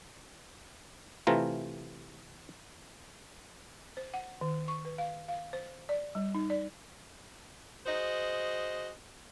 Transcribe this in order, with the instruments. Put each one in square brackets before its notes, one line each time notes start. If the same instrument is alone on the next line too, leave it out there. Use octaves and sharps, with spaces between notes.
[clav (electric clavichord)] C3 E3 A3 F4 A#5
[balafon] C5
F#5
D#3
C#6
B4
F5
F5
C5
D5
G3
D#4
D5
[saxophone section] F#4 G#4 C5 D#5